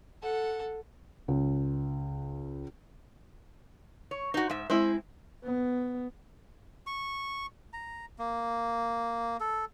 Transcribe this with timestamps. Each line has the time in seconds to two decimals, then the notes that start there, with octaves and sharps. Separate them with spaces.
0.22 A4 F#5
1.28 C#2
4.11 C#5
4.34 D#4 F#4 C5
4.50 G#2 E5
4.70 G#3 C4 E4 C5
5.44 B3
6.87 C#6
7.73 A#5
8.19 A#3
9.41 A4